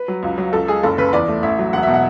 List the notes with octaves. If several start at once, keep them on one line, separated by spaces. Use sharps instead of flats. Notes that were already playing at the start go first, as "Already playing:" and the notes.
Already playing: B4
F#3
C#2
F#3
C#2 A4
G#3 G#4
F#1 A4
C#3 B4
E2 D5
A3
A1 E5
F#3
E1 F#5
B2 E5
F#5